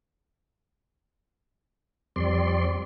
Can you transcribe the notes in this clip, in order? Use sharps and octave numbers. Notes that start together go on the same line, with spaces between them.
F2 G3 C4 D5 C6